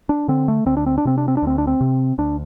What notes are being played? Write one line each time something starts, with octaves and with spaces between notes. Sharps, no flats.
D4
D3 C4
A3
D2 C4
D4
C4
D4
C3 C4
D4
C4
D4
D2 C4
D4
C4
C3
D2 D4